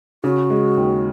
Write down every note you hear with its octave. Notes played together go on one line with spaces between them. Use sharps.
C#3 F#4
G#3
D#2